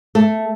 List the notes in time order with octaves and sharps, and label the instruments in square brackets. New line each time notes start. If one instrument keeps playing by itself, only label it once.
[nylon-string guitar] A3